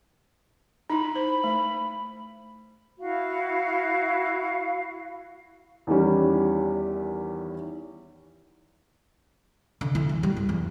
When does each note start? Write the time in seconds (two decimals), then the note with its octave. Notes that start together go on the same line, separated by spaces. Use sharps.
0.90 D#4 E4 B5
1.15 C5
1.44 A3
3.00 E4 F#4 F5
5.87 E2 D#3 G3 C#4
9.81 D3
9.95 E4
10.09 E3
10.23 G3
10.37 G2
10.49 E2